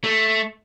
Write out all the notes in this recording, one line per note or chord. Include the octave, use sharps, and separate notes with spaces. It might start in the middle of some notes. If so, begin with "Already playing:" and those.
A3